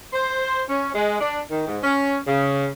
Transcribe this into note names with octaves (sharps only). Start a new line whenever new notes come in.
C5
C#4
G#3
D4
D#3
G#2
C#4
C#3